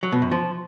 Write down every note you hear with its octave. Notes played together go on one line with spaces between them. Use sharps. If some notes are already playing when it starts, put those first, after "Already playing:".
F#3
B2
F#2
F3